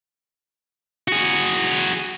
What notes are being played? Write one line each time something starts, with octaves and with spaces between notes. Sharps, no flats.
F#4 G#4